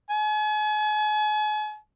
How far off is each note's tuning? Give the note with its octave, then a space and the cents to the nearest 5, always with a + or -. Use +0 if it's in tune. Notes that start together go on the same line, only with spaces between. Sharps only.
G#5 +40